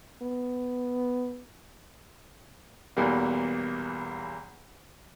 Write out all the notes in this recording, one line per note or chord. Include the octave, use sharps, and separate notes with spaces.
B3
B1 E2 E3 G3 A#3